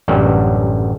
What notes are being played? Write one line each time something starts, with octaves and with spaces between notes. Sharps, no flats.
A1 F#2 D3 F#3 G3